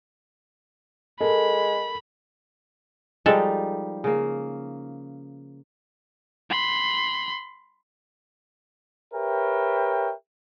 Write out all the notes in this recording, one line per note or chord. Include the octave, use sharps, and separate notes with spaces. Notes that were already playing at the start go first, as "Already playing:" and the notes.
G#3 A4 A#4 B5
F3 G3 G#3 D#4 A4
C#3 A#3
B5 C6
G4 A#4 B4 C#5 E5 G5